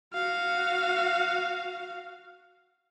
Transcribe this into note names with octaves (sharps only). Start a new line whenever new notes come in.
F#4 F5